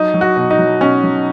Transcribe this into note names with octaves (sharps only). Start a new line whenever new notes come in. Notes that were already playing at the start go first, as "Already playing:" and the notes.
Already playing: F#3 D#4
F#3
F#4
B2
D#4
F#3
B2 C#4
F#3